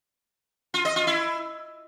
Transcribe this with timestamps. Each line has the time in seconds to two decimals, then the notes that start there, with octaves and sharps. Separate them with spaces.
0.74 F4
0.85 D#5
0.96 F4
1.07 E4